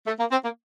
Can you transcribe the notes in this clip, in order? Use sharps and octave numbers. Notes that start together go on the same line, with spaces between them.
A3
A#3
C4
A#3